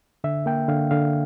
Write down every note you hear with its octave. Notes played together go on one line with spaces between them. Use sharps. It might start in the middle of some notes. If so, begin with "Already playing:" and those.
D3 E5
A#3 G5
D3 F5
D3 F5